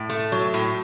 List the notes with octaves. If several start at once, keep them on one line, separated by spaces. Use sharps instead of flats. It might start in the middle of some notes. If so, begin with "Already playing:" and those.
Already playing: A2
A3
F#3
A2